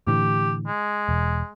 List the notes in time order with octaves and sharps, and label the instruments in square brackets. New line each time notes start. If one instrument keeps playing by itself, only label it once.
[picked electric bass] A2 D3 E3 [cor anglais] G4
[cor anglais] G#3
[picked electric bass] E1